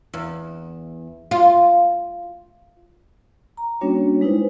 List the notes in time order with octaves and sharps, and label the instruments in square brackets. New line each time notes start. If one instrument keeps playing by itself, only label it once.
[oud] E2
F4
[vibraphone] A#5
G3 A#3 C#4 D4 F#4 C#5
G#3 D#4 E4 B4 C5